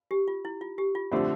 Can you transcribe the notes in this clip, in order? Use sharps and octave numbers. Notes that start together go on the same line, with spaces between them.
G4
F4
E4
F4
G4
F4
D3 F3 A3 C4 G4